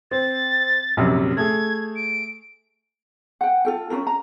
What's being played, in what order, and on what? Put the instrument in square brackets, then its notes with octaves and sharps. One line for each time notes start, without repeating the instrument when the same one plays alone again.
[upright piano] C4 [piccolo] A6
[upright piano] A#1 F#2 C3
[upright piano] A3 G#4 [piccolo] G#6
[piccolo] D7
[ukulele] F#5 G5
F4 A4 G5
C#4 D4 F4 A#4
A#5